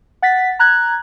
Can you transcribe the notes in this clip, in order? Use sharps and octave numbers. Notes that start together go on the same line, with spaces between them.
F#5 A6 B6
A#5 F#6 G#6